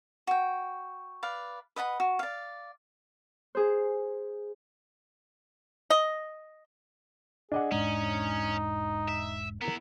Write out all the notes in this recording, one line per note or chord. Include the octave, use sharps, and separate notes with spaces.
F#4 G5
B4 D5 F5
B4 D#5 F#5 B5
F#4
D5 F5
G#4 C5
D#5
D4 G#4 D#5 F#5
E1 G#2 G#3 C#4 D#4
E5
B3 E4 A#4